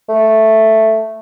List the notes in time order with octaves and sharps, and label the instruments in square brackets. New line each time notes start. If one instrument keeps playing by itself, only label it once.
[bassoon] A3